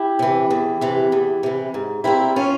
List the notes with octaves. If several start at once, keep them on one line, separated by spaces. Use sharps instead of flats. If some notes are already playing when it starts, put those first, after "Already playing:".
Already playing: E4 G4
C3 E3
E2
C3 E3
E2
C3 E3
G#2
G3 A#3 C4 E4
C#4 F4